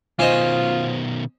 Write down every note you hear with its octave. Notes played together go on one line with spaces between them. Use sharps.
B2 D#3 C#4 F4 C5 D#5